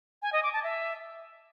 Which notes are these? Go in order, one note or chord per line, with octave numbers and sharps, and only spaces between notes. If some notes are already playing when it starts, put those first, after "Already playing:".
G#5
D#5
D6
A5
E5